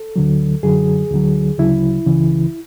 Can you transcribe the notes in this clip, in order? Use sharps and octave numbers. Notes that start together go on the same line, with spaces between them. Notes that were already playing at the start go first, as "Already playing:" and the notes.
Already playing: A4
D2 D3 F#3
F#2 D3 F#3 G#4
D2 D3 F#3
D2 C#3 F#3 E4
C#2 C#3 E3